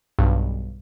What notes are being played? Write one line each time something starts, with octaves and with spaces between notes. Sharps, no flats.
B1 G2